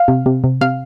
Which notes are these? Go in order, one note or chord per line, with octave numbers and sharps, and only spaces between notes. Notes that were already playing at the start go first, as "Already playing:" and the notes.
Already playing: F5
C3
C3
C3
C3 F5